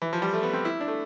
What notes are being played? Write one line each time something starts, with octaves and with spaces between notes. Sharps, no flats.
E3
F3
G3
A3
B3
C4
E4
D4
A3